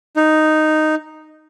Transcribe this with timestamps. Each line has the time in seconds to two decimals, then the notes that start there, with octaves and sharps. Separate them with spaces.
0.16 D#4